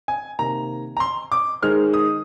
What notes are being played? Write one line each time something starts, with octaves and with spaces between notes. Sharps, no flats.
G#5
C3 D#3 A#3 A#5
A#5
C6
D6
D#3 G#3 D#4 G#4 C5 F6
D#6